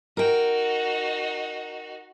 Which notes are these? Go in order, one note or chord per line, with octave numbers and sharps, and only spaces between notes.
D#4 F#4 A#4 G5